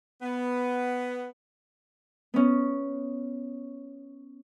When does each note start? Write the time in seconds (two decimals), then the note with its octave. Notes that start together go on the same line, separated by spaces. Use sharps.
0.22 B3
2.34 B3 C#4